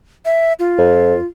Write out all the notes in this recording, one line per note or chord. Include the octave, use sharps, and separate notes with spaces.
E5
F4
F2